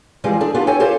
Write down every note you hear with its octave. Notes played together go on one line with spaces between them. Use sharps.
E3 F3 G3 G#3 C4
D4 G#4 A4
B3 D4 F4 G4
A4 C#5 G5 G#5
F4 G4 A4 C5 C#5